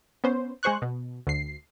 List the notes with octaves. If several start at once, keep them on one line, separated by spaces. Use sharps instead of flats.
B3 C#4 C5
G#3 G#4 C5 C#6 F#6
B2
D2 C7